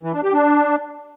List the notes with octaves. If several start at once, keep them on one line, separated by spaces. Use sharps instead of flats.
E3
D4
G4
D4